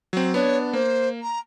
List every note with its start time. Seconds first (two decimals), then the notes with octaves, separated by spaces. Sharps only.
0.13 F#3 C4
0.34 B3 D4 C#5
0.73 A#3 C5
1.22 A#5